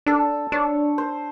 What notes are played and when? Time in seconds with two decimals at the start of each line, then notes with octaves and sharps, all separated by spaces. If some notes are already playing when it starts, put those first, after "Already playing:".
0.06 D4 A4
0.52 D4 C#5
0.98 C5